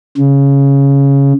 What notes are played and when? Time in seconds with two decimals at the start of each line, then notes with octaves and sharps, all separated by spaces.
0.17 C#3